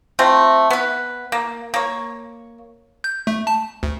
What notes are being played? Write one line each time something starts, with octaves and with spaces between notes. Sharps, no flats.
A3 C4 F4
B3 B4
A#3
A#3 C#5
G6
A3
A5
D2